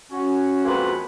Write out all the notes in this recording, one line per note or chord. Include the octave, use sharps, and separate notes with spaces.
C#4 F#4
F2 G#3 A#3 C4 F#4 B4